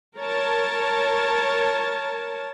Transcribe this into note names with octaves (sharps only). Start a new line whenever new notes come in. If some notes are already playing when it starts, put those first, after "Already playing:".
A#4 C#5 A5